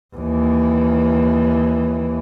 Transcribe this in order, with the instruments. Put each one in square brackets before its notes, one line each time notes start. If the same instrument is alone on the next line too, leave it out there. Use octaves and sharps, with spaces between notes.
[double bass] D#2 E3